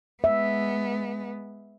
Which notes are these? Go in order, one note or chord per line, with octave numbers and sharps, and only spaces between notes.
G#3 B3 E5